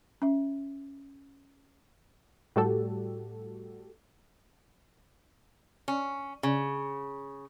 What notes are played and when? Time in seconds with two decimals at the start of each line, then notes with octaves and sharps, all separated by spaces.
0.22 C#4 E5
2.56 A2 G3 F#4 G4 A4
5.88 C#4
6.43 C#3